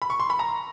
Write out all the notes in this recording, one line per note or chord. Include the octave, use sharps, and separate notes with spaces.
B5
C#6
C6
B5
A#5